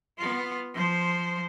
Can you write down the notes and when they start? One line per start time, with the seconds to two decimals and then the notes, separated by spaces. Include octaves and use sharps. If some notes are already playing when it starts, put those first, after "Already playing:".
0.18 B3 F4
0.74 F3 C5